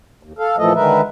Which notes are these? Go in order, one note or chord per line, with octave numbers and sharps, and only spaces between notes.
D#2
A4 F5
A#2 E3 F3 A3 A4 D#5
D3 D#3 G#3 A#4 B4 E5